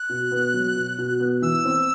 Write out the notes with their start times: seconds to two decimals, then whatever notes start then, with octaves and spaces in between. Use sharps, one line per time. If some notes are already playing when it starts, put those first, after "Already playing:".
Already playing: F#6
0.09 B2
0.31 B3
0.54 F#3
0.76 B2
0.98 B2
1.20 B3
1.42 E3 E6
1.65 C4